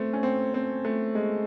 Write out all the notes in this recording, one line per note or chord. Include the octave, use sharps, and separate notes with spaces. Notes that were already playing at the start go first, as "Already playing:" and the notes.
Already playing: A3 C4
C#4
C4
C4
A3
G#3